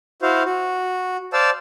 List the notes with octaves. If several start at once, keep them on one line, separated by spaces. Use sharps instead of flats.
E4 F#4 C5 F5
F#4
C5 D5 F5 A5 E6